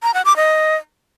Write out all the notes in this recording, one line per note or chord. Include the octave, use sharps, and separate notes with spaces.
A#5
F#5
D6
D#5